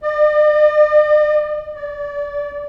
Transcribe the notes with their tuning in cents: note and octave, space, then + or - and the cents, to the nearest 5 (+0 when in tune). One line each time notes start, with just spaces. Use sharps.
D5 +45
D5 -25